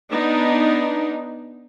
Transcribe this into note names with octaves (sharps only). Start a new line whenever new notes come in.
B3 D4 D#4